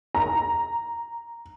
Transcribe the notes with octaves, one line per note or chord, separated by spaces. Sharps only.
A#5